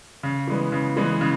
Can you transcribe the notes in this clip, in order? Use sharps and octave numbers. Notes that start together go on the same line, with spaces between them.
C#3
E3 G#3 B3
C#3
E3 G#3 B3
C#3